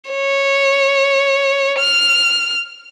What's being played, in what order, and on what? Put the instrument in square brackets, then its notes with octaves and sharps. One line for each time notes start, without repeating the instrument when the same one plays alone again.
[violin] C#5
F6